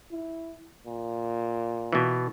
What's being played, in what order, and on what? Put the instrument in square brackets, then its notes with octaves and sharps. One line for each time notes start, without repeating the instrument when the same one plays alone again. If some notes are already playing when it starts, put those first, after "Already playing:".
[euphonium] E4
A#2
[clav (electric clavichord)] B2 E3